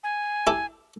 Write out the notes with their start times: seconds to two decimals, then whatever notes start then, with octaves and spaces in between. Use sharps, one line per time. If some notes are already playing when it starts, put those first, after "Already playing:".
0.03 G#5
0.47 E4 G4 A4